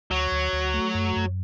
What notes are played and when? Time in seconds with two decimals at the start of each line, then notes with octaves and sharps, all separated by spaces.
0.11 D2 F#3
0.32 D2
0.53 D2
0.74 A3
0.95 F#2
1.16 F#2